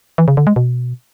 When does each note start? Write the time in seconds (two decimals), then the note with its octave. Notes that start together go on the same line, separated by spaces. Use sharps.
0.18 E3
0.28 C#3
0.37 D3
0.47 G#3
0.56 B2